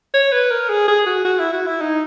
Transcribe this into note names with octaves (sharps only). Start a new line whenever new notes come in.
C#5
B4
A#4
G#4
G#4
F#4
F#4
E4
F#4
E4
D#4